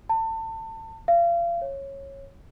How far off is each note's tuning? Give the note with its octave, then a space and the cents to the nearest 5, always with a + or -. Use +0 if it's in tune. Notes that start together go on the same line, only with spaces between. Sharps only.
A5 +30
F5 -35
C#5 -15